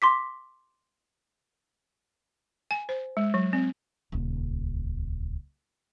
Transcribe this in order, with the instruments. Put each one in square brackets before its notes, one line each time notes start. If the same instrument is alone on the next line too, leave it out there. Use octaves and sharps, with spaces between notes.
[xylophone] C6 D6 B6
[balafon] G#5
C5
G#3
F#3
C4
[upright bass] D#1 C#2